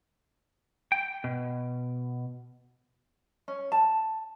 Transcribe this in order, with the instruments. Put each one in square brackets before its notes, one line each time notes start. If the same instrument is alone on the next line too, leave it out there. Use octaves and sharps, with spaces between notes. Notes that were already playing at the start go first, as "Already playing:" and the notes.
[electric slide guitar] G5
B2
[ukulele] C#4
A5